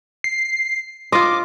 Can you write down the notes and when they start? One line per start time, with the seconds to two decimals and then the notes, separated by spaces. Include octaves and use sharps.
0.24 C7
1.12 F4 D#5 C6 D6